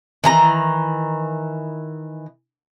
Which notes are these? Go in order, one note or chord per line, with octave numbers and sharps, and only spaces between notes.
D#3 E3 A#5